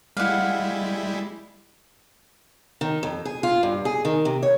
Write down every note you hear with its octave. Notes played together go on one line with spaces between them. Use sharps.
G3 G#3 E4 F5 F#5
D#3
F2
G#4
F4
G2
G#4
D#3
C3
C#5